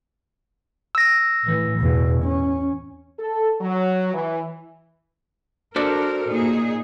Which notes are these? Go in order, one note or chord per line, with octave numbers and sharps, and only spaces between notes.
E6 A#6
A2 E3
E2 B2
C#4
A4
F#3
E3
D4 F#4 A4 A#4 C5
A#2 D#4 G#4